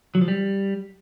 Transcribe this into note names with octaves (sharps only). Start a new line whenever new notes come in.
F#3
F3
G3